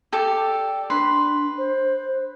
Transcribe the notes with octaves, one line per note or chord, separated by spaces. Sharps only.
G4 A4 D5
D4 B4 C6
C5